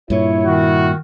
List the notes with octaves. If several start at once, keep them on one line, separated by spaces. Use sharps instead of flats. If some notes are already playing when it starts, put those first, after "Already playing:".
G2 A#2 E4 C#5
D#3 F#4